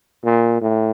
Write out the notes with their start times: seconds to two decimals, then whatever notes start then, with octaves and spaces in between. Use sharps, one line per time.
0.25 A#2
0.61 A2